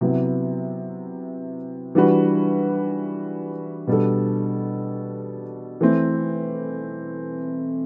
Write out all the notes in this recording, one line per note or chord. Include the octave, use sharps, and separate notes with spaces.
C3 F#3 B3 E4
E3 G3 D4 F#4 B4
B2 G3 D4 A4
E3 A3 C4